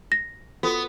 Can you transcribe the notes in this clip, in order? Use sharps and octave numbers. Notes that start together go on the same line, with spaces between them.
A#6
B3 F4 F#4 A4